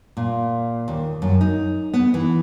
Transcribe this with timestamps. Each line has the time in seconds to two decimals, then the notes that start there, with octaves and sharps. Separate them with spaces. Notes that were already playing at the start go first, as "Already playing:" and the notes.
0.17 A#2
0.88 D#2
1.22 F#2
1.41 D#4
1.94 B3
2.14 E3